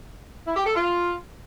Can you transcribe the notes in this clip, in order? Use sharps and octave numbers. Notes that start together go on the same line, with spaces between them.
E4
G4
A4
F4